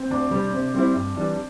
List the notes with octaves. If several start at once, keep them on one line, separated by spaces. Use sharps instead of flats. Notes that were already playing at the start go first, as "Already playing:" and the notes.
Already playing: C4
D2 D4
C3 G3
C3
G3 C4 E4
G2
E3 G3 D4